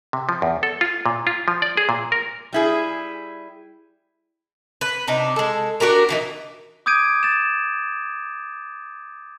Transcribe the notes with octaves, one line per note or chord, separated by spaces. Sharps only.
C3
F3
E2
A4
F4
A#2
F4
F3
D5
G#4
A#2
A#4
G3 E4 G#4
B4
C3 D4 D#4
G#3 A4
D4 F#4 G4 A#4
A#2 E3 D#4
D6 D#6 G6 G#6 D7 D#7
A6 E7